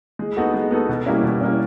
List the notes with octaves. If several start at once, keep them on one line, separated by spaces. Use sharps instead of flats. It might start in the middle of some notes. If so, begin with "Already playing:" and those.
G#3
B3 D#4 F#4 A4
G#3
B3 D#4 F#4 A4
B2
G3 A#3 C#4 E4
B2
G3 A#3 C#4 E4